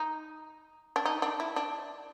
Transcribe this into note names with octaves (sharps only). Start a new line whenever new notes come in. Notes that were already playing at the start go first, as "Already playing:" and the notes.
Already playing: D#4
D4
D#4
D4
E4
D4